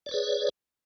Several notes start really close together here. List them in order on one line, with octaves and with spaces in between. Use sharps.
D5 C#5 B4 G#4